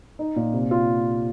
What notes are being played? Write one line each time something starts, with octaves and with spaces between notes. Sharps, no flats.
D#4
A#2
C3
F4